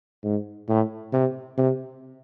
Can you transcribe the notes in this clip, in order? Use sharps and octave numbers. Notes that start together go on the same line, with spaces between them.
G#2
A2
C3
C3